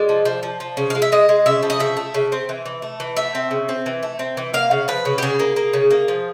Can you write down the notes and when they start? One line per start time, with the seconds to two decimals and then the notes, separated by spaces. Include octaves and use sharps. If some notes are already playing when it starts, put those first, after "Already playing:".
Already playing: G#3 D5
0.09 F3
0.25 F3
0.43 F3
0.60 F3
0.77 C#3
0.90 G#3 F5
1.02 E5
1.12 G#3 D#5
1.29 G#3
1.46 C#3 E5
1.63 F3
1.70 D#5
1.80 C#3 E5
1.97 A3
2.14 C#3
2.32 C4
2.49 E3
2.66 E3
2.82 A3
3.00 E3
3.17 A3 E5
3.35 C4
3.51 C#3
3.69 C4
3.86 E3
4.03 A3
4.19 C4
4.37 E3
4.54 A#3 F5
4.71 C#3
4.88 F3 B4
5.05 C#3
5.18 G4
5.22 C#3 G#4
5.39 A#3
5.56 A#3
5.73 C#3
5.90 A#3
6.08 F3